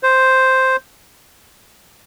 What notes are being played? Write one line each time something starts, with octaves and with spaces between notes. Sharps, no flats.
C5